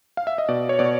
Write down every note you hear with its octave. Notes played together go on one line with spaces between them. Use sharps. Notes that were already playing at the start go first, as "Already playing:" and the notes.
F5
E5
D#5
B2 D5
C#5
B2 D5